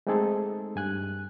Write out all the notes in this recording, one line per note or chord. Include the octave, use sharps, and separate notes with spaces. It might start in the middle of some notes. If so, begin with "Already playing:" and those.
G#3 A3 C4 D#4 G#4 A4
G2 G#5 F#6